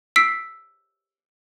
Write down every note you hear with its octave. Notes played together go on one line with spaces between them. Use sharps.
E6 B6 C7 D7